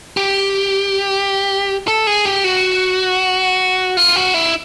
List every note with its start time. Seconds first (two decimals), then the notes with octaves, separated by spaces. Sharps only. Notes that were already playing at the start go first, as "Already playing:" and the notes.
0.17 G4
1.88 A4
2.07 G#4
2.25 G4
2.44 F#4
3.97 F4
4.16 F#4
4.34 E4